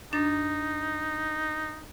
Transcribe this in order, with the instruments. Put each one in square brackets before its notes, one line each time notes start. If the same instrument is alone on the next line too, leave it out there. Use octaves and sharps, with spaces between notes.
[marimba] F#2 D4 A6 [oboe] D#4